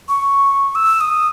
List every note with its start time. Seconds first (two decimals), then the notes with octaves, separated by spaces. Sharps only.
0.09 C#6
0.75 E6
1.01 D#6